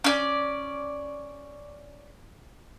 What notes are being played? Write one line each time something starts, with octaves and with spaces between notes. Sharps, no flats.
C#4 D5